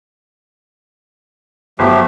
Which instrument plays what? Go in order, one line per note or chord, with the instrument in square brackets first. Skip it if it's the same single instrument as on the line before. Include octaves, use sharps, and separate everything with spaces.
[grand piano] G1 F#3 [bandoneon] F3 A3 G4